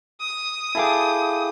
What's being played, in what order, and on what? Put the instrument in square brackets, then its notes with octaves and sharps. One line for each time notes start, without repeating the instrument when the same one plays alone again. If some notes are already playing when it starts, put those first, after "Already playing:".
[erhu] D#6
[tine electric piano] E4 G#4 D6 [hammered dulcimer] A4 F5 G5